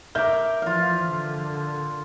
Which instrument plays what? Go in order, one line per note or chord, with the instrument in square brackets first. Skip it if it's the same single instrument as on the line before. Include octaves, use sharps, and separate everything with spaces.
[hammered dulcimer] A#4 D6 [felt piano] E5 G6
[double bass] E3 F3 [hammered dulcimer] F4 F5
[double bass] D3